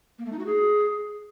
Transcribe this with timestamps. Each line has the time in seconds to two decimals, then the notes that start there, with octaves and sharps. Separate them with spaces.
0.19 A#3
0.25 A3
0.32 D#4
0.39 F#4
0.46 G#4